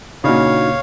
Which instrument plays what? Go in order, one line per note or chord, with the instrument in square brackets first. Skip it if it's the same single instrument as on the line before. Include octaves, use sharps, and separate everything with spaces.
[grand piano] A#2 C#3 [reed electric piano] D4 D#4 F#4 [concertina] C#5 F5